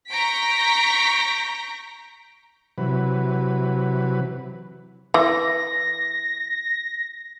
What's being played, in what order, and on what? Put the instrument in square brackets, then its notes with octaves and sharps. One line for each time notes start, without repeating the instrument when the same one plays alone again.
[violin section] A#5 C#6 G6 A#6 B6 D7
[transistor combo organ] C3 E3 F#3 B4
[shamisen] E3 [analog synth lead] A#6